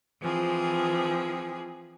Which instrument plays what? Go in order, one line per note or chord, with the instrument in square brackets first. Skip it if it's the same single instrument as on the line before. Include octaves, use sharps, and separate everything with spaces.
[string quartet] E3 F3 C4 G#4